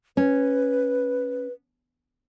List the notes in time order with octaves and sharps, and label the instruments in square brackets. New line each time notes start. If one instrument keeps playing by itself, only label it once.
[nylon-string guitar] C#4 [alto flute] B4